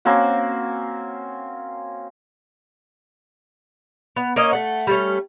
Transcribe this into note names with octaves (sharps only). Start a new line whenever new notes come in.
A#3 C4 C#4 F#4
B3
A#3 C#4 C#5 D#5
A3 F#5
G3 A3 C#4